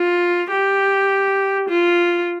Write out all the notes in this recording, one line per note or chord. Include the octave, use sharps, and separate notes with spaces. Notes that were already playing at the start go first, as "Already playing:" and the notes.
Already playing: F4
G4
F4